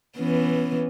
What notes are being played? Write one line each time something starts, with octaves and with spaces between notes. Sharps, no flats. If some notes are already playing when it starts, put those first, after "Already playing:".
E3 B3 C#4